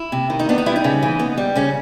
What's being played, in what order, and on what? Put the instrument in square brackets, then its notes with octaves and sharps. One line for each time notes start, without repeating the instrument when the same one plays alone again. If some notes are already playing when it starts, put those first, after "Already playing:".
Already playing: [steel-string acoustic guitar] E4
C3
D#3
D#4
B3 D4
D#4
G3 E4
D#4
C#3
E3
B3
G3
C#3 C#4